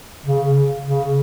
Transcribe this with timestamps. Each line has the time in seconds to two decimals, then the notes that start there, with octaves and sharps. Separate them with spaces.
0.26 C#3
0.87 C#3